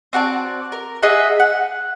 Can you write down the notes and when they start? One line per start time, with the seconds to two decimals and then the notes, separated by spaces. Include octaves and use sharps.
0.13 C4 F#4 D5 A5
0.72 A#4
1.02 G#4 D#5 E5 F#5
1.40 F#5